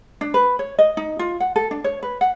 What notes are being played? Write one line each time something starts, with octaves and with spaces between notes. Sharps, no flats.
D4
B4
C#5
D#5
D#4
F4
F#5
A4
D4
C#5
B4
F#5